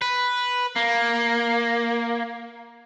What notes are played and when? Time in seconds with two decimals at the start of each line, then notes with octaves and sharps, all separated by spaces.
0.02 B4
0.76 A#3